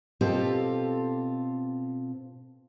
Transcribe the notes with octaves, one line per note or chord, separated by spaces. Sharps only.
B2 C4 F4 G4 A4